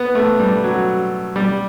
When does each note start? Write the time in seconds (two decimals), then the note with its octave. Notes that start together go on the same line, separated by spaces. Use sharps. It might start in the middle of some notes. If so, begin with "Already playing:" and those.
Already playing: B3
0.15 A3
0.40 G3
0.64 F#3
1.36 G3